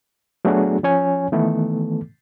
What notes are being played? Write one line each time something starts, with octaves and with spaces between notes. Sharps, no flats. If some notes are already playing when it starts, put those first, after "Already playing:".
F#3 A3 B3 D4 F#4 G#4
F3 C#4 C#5 G#5
D#3 E3 A3 B3 A4